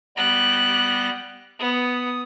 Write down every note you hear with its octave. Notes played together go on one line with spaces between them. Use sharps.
G3 B3 G4 F#6 A#6
B3 D#6